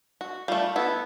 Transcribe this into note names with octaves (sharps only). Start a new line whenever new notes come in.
F#4
G3 A3 F4
B3 E4 A4